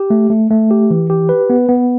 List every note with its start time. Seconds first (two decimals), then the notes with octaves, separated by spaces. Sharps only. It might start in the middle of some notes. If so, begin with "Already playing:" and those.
Already playing: G4
0.10 A3
0.30 A3
0.51 A3
0.71 G4
0.91 E3
1.10 G4
1.29 B4
1.50 B3
1.69 B3